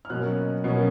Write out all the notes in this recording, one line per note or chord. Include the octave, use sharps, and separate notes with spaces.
F6
B2 F#3 A#3 C#4 F#6
B2 F#3 A#3 C#4